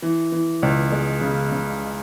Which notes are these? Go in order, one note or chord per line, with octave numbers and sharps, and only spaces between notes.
E3
E3
C#2
G#3
C#3
C#3